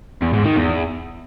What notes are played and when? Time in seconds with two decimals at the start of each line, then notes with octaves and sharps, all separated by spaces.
0.22 E2
0.34 G#2
0.45 D#3
0.56 E2